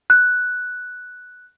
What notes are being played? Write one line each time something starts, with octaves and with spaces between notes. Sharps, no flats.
F#6